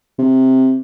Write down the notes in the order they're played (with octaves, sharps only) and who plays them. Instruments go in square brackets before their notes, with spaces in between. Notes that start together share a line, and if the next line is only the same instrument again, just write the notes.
[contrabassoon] C3